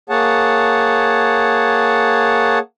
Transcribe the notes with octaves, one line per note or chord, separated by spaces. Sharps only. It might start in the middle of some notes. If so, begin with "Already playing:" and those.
A#3 G#4 C#5 F#5 A5